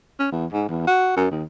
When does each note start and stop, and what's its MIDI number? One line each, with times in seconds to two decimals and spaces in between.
0.19 0.27 61
0.32 0.46 40
0.53 0.65 44
0.69 0.83 40
0.87 1.16 66
1.17 1.30 42
1.31 1.44 39